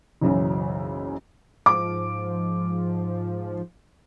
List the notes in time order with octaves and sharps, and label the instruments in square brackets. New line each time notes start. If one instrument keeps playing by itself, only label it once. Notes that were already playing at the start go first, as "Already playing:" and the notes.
[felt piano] F#1 B1 F#2 C#3 E3
[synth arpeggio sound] G#2 F3 [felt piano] D6